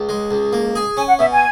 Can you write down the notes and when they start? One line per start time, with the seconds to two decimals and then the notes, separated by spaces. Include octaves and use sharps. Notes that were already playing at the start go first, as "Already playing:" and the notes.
Already playing: C#2
0.09 G#3
0.31 C#2
0.53 A#3
0.75 G#4
0.97 C#4 G#5
1.08 F#5
1.19 B2 E5
1.31 G#5